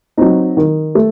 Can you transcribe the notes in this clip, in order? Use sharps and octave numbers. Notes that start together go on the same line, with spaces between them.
F#3 C4 D#4
D#3
A3